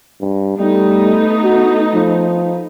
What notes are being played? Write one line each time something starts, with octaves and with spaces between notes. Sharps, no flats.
G2
G3 A3 B3 D#4
F#4
F3